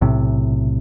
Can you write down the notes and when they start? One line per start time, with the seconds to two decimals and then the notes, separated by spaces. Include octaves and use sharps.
0.01 B1 A2 C3